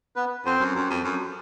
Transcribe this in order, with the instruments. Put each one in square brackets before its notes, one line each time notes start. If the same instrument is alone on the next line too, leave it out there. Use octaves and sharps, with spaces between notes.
[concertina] B3 B4
[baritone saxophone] F2 [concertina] C4 C5
[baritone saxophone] F#2
F#2
F2
F#2